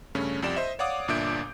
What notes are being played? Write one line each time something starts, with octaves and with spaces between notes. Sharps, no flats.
G2 C#3 A3 C#4
C2 F2 G4 D5 E7
C5 D#5 E5
C#5 D5 F5 F#5 D6 D#6
G1 A#2 D4 E5 G6 D7